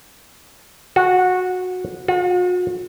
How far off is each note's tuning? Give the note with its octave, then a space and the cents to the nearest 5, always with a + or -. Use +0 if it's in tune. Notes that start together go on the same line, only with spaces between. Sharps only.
F#4 -15
F#4 -45